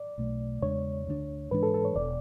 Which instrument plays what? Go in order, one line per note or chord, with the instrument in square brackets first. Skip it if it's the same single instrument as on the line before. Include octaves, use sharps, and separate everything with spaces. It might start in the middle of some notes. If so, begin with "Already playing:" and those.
Already playing: [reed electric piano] D5
[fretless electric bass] B1 B2 A3
[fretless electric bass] E2 C#3 G#3 D4 [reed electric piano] C#5
[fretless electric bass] D2 D3 A3 D4
[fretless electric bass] G#2 E3 G#3 D4 [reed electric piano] B4
[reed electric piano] A4
A4
C#5
[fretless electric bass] E1 B2 [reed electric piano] D5